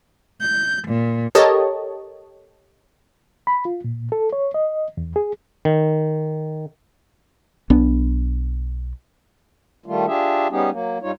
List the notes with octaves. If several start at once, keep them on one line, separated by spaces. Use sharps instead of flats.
G6
A#2
G4 A4 A#4 C#5 D#5 A5
B5
F4
A#2
A4
C#5
D#5
E2
G#4
D#3
B1 B3 D4
D#3 G3 A3 F4
D4 F4 G4 G#4 E5
G3 B3 C#4 D#4 G4 G#4
F#3 A#3
G2 G3 D#4 F4 C#5